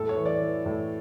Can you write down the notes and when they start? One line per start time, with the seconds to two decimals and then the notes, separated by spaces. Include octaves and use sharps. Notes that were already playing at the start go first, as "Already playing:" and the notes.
Already playing: A2 A4
0.09 C#5
0.17 E3
0.26 D5
0.41 E3
0.66 A2